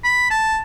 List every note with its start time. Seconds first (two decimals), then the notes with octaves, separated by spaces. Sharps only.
0.04 B5
0.30 A5